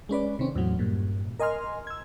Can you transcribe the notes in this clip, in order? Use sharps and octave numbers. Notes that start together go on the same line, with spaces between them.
G#3 C#4 B4 D5
C3 D#3 C4 C#4
E2 A2 F#3
G2 A#2
A#4 D#5 G#5 C6 F6
E6 G#6